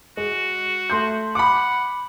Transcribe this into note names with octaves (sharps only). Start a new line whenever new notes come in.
G#3 F#4
A3 C6 G6
F#5 B5 D6